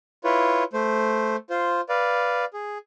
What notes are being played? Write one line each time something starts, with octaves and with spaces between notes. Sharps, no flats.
E4 F4 B4 C#5
A3 C5
F4 C5
B4 D5 F5
G#4